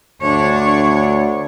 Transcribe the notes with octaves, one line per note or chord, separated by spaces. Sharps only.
D2 D4 C#5